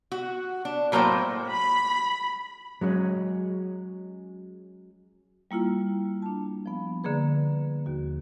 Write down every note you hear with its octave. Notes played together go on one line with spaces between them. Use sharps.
F#4
D4
A2 F#3 A#3 C5 G5
B5
F#3 G#3 C#4
G3 A#3 E4 F4
D4 A5
F3 B3
D3 A#3 G#4 B4
D#2 F#4